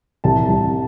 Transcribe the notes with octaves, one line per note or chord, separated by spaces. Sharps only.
C2 A5
C2